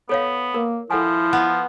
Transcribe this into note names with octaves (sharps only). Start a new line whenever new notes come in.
B3 A4 C#5 F5
A#3 A#4
F3 E4 A4 F#5 G#5
B3